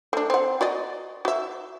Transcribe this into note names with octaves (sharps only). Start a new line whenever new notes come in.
A3 D4
C4 F#5
F#4 D5 D#5
F#4 E5